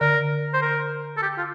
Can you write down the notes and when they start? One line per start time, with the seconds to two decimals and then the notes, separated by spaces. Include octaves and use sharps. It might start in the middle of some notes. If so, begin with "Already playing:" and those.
0.01 D3 A#4
0.54 C5
0.62 A#4
1.17 A4
1.22 G4
1.38 F4